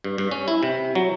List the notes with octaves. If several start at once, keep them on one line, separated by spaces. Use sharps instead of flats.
G2
G2
C#4
E4
C3
F#3